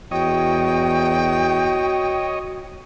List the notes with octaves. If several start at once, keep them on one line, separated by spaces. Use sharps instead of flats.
E2 F#4 C#5 D#5 G5